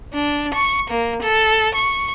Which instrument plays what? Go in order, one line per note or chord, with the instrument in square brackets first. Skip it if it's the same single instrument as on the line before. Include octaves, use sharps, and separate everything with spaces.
[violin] D4
C#6
A#3
A4
C#6